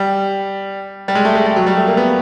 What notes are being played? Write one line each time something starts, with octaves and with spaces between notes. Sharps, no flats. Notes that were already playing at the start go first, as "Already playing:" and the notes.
Already playing: G3
G3
G#3
A3
G#3
G3
F#3
G3
A3
A#3
B3